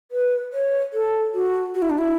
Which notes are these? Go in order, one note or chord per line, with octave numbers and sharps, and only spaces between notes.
B4
C#5
A4
F#4
F#4
E4
D4
E4